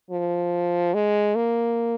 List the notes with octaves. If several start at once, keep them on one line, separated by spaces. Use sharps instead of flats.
F3
G#3
A#3